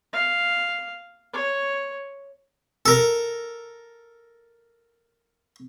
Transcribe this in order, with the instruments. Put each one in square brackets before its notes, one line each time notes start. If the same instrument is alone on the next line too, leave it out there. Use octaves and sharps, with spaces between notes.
[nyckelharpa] F5
C#5
[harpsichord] A4 A#4